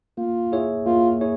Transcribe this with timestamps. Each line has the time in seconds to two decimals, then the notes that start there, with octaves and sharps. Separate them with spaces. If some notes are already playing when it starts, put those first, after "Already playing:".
0.18 A#3 F4
0.52 E4 G#4 C#5 E5
0.86 A#3 F4
1.21 E4 G#4 C#5